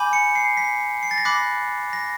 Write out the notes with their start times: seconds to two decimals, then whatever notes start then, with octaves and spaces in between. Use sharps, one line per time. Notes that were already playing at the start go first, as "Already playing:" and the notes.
Already playing: G#5 B5 D6 G6
0.13 C#7
0.35 C7
0.57 B6
1.03 C7
1.11 A6
1.18 A#6
1.25 B5 D6 F#6 B6
1.93 A#6